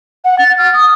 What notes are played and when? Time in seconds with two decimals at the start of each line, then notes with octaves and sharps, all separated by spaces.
0.25 F#5
0.38 A6
0.58 F6
0.73 D#6